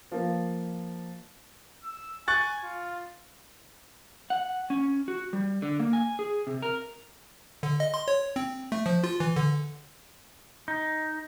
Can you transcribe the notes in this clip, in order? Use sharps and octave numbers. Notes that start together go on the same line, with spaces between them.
F3 A#3
E6
G#5 C#6 F#6 A6
F4
F#5
C#4
F#4
G3
D3
A#3
G#5
G#4
C3
A#4
D3
D#5
C6
C#5
C4
A3
F3
F4
E3
D3
D#4